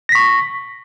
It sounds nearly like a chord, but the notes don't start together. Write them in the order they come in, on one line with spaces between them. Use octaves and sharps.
A#6 B6 C#6